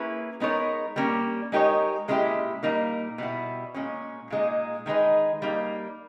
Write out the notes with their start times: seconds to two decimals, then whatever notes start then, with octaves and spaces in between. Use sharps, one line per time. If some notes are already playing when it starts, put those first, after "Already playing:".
Already playing: A#3 C#4 E4 G#4 B4
0.40 G#3 B3 D#4 A#4 C#5
0.96 G3 A#3 C#4
1.52 G#3 D#4 G4 A#4 C#5
2.08 A#2 G#3 C#4 E4 G4
2.63 A#2 G3 A#3 D#4 A#4
3.18 B2 G3 B3 E4
3.74 A#2 G#3 C#4
4.30 A#2 G#3 D#4 G#4
4.86 D#3 G#3 D#4 G#4 B4
5.42 G3 A#3 D#4